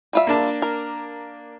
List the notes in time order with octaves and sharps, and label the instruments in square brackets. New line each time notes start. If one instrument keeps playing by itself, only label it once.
[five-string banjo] G3 F4 E5
[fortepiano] A#3 D4 A5
[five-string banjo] A#4